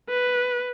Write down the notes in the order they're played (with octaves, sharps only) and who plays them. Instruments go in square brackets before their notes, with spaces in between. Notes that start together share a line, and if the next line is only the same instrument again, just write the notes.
[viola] B4